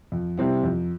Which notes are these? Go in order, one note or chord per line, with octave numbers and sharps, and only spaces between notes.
F2
C3 G3 C4 E4
F2